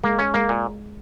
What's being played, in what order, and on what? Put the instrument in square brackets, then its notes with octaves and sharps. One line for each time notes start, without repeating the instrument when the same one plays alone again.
[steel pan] G#3 [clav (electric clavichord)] A#3
[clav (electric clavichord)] C#4
[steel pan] G#3 [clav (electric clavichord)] A#3
[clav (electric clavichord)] A#2